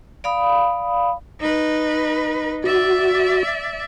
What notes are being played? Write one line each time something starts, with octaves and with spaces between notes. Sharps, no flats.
D5 F5 B5 D#6
D#4 B4
F#4 D5 E5